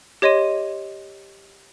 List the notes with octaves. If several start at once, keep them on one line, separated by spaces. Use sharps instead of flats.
G4 C#5 D#5 C6 D#7